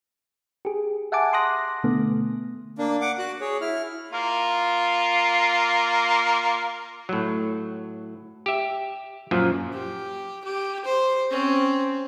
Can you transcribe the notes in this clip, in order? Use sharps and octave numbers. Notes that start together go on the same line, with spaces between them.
G4 G#4
E5 F#5 G#5 A5 D6
C6 D6 D#6 F#6 A#6
B2 D3 A3 B3
A#3 D4
F#5 D6
F#4 F#6
G#4 C#5
E4 F6
A#3 F4
A2 F#3
G4 E5
F#2 A#2 F3
G4
G4
C5
C4 C#4